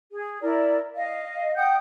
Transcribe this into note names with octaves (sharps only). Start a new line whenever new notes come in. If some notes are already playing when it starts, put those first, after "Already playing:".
G#4
E4 A#4 D5
D#5 F5
F#5 G5 D#6 G6